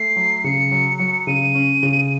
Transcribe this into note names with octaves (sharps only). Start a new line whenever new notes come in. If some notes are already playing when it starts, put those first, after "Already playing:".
Already playing: A3 C7
F#3
C#3 C#7
F#3
F#3
C#3 D#7
C#4
C#3